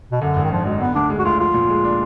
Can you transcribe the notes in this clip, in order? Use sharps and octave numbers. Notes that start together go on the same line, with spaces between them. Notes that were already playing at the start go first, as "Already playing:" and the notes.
B2
F#2 D3
G#1
D#3
D3 F3
F#3 G#3
D3 B3
D2 D4
G#3
F#4
D2 F4
F3 F4
A#2
G#3
D4